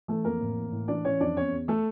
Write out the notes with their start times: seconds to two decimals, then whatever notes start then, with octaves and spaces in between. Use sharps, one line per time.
0.08 E3 A3 A4
0.25 F2 A#3 A#4
0.41 A2
0.57 E3
0.72 A2
0.88 E3 D4 D5
1.05 E3 C#4 C#5
1.20 F2 D4 D5
1.36 E2 C#4 C#5
1.52 E2
1.68 A3 A4